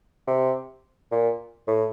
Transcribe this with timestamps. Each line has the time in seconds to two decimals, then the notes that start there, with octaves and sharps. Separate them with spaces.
0.27 C3
1.12 A#2
1.68 A2